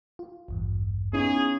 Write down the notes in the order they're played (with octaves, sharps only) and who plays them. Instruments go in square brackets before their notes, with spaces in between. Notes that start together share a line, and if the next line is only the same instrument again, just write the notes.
[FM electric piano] F4
A1 E2 G2
[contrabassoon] C#3 [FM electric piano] B3 D#4 E4 [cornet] G#4